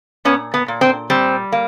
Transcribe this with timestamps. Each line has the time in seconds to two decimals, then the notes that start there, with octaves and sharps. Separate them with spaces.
0.25 A#2 B3 C#4
0.54 B3
0.68 A#2
0.81 C4
1.10 G3 C4
1.52 A#3